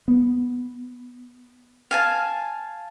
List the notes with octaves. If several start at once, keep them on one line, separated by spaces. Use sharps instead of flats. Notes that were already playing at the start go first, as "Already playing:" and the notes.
B3
F5 G#5 A5